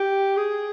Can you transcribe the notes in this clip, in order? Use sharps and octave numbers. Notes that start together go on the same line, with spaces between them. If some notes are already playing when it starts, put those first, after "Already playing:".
Already playing: G4
G#4